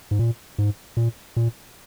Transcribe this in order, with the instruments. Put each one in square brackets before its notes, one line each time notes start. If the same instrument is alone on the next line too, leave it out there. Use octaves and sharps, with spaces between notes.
[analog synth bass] G#2
A#2
G#2
A#2
A#2